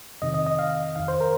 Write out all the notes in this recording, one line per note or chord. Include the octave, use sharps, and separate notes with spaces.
F2 C3 D#3 D#5
D#5
D#5
F5
F2 D#3 F5
C5
A#4